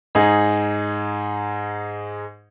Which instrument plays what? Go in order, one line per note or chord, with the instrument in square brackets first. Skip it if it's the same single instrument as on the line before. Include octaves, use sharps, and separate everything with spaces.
[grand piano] G#2 D#4 G#4